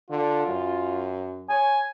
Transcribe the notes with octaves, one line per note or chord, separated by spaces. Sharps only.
D3 F4
F#2
C#5 G#5